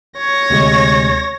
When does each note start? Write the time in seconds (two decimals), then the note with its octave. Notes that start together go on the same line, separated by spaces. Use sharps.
0.18 C#5 A#6
0.50 D2 C3 G#3